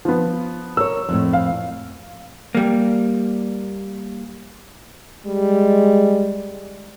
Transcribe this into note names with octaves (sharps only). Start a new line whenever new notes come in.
F3 B3
A#4 C#5 E6
F2 A2
F5
G3 A#3
G3 G#3